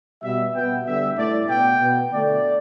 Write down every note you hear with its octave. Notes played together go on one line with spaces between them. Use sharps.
B2 G3 B3 E5
B2 B3 G5
D3 G3 B3 E5
A2 A3 D5
B2 B3 G5
B2 B3
D3 A3 D5